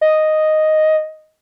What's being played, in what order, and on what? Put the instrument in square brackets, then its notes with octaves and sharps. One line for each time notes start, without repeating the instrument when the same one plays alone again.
[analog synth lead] D#5